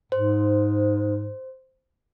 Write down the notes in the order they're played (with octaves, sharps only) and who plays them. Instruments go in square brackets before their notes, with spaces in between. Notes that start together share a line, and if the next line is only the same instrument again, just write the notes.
[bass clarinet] G#2 [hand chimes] C5